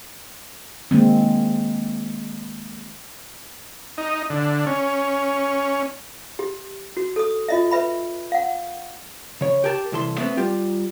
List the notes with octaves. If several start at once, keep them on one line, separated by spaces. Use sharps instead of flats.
D#3 G#3 A#3 C4
D#4
D3
C#4
G4
F#4
A4 D#6
F4 D#5 E5
B4 E5 B5
F5 F#5
C#3 C#5
G4 A#4 G#5 A5
C2 E3 A4 C6
A3 B3 C4
G3 F4 G4